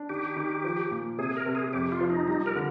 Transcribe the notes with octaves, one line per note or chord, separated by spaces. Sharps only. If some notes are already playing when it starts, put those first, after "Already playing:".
Already playing: D4
D#3 G4
D#3
F3
A#2
C3 G#4
A#4
C3
G#4
F2 G4
F4
F3
D#4
G3 D#4
A#4
D3